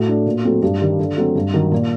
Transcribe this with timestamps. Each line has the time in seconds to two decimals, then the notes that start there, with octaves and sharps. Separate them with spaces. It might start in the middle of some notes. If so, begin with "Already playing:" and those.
Already playing: A2 F#4
0.08 A3 D4
0.26 A#2
0.44 F#3 A3 C4
0.62 G2 G4
0.80 D#3 G3
0.99 D3
1.18 F#3 A3 C4
1.35 G2
1.54 D#3 F#3
1.72 A#2